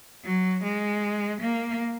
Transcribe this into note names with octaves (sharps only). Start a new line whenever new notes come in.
F#3
G#3
A#3